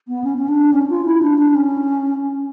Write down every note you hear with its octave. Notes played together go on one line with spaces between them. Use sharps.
B3
C#4
C#4
D4
C#4
F4
E4
D4
D4
C#4